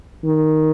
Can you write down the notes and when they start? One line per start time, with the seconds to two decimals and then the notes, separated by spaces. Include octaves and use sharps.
0.24 D#3